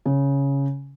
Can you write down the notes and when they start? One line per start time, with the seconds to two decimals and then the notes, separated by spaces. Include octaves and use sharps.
0.05 C#3